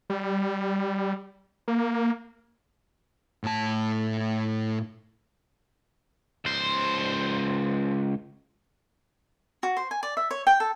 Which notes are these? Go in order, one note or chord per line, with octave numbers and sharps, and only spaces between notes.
G3
A#3
A2 A5
C#2 C5
F#4
C5
G#5
D5
E5
C#5
G5
A4